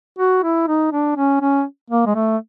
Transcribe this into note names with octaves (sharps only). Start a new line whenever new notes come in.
F#4
E4
D#4
D4
C#4
C#4
A#3
G#3
A3